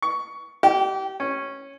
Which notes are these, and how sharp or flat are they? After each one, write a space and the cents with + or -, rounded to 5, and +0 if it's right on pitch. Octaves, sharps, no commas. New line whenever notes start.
C#6 +15
G4 -30
C#4 -10